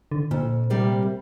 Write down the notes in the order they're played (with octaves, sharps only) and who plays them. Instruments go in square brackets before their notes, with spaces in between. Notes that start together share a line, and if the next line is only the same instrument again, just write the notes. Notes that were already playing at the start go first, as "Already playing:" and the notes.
[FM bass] D3
[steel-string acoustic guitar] F2 [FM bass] A#2
[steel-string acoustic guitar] C3 G3 A#3